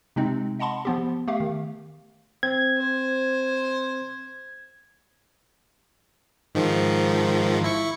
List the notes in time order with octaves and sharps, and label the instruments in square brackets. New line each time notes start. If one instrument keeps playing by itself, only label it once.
[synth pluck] C3 G#3 C4 D#4
D#5 F#5 A5 B5 C6
F3 B3 G4
A3 G4 F5
D#3
[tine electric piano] C4 [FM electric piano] G#6
[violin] C5
[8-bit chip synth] G#2 D#3 F3
E4 C#6